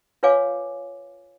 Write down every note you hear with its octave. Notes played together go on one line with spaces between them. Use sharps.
F4 B4 C#5 F5 G#5 D6